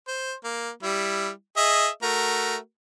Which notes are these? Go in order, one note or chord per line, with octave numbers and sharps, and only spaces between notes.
C5
A#3
G3 E4
G#4 D#5 E5
A3 F#4 A#4